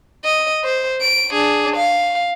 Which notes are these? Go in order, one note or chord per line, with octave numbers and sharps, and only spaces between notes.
D#5
C5
D7
D4 G#4
F5